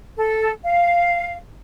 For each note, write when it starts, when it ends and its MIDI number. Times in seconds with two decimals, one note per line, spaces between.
0.17 0.50 69
0.63 1.36 77